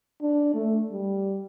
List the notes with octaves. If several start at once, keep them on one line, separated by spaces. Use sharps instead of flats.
D4
A3
G3